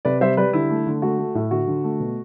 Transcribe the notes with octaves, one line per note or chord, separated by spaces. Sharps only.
C3 B4 D5
G3 C5 E5
G3 B4 D5
D3 E4
A3
D3
A3 F#4
A3
A2
D3 F#4
D3
A3
B2